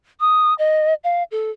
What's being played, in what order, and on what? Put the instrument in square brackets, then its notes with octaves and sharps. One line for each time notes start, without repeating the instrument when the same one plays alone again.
[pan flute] D#6
D#5
F5
A4